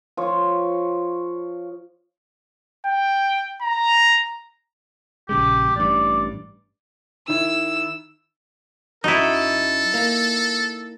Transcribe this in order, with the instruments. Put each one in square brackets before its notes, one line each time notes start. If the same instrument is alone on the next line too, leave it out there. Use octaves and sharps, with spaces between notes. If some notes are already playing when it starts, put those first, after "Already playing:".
[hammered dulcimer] F3 C#5
[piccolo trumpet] G5
A#5
[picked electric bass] A#1 C#3 G#3 [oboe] G4
[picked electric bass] A1 G2 [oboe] D5
[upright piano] D#3 E4 [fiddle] E6
[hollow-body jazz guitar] F#2 F#4 [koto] D#4 E4 [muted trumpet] A4
[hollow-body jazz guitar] A#3